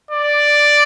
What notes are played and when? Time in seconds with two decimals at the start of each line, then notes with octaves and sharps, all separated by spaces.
0.11 D5